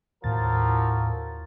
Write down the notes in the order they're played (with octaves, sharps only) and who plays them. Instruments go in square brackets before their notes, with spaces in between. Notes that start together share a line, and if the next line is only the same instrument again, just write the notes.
[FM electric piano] D#2 A6 [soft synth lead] A2 [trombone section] F3 F#3 A#4